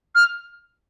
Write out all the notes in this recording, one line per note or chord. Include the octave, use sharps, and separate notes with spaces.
F6